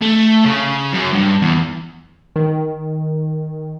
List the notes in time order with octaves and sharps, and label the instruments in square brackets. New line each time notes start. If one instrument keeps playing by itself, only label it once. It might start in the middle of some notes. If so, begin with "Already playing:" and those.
[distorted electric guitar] A3
C#3
F#2
G2
E2
[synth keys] D#3